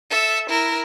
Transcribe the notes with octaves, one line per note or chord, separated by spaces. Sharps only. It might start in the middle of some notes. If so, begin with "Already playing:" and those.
A4 E5
E4 A#4